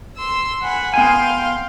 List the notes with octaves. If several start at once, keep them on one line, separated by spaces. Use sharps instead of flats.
C6 E6
F#5 G#5 B5
B3 F5 G5 G#5 C6